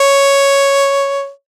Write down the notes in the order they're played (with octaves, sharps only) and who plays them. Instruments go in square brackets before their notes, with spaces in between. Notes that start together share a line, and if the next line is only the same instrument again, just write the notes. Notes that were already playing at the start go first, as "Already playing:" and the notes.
Already playing: [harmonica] C#5